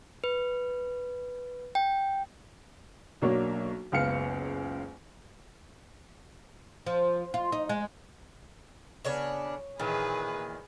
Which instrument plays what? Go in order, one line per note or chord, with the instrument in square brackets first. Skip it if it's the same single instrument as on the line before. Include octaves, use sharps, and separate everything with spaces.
[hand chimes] B4
G5
[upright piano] B1 F#3 A#3 D4 C#5
F#1 C#2 B3 F5 F6 C#7
[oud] F3
F4
D#4
G#3
[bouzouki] C#3 B3 D4 [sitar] C#5
[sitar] E2 D#3 [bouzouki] A#2 [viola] G#4 B4